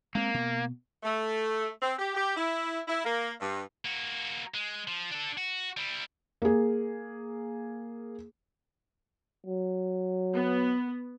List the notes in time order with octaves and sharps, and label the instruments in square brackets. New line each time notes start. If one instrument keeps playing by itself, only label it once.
[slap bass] G#3 C4 [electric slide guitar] A#3
[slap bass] B2
[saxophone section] A3
C4
G4
G4
E4
E4
A#3
G2
[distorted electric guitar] A#3 F#4
G#3
F3
D4 A4
F#4
G3 E4
[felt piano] A#3 G#4
[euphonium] F#3
[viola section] B3